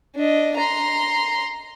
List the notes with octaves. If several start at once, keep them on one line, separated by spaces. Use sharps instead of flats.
D4 D#5
A#5 C6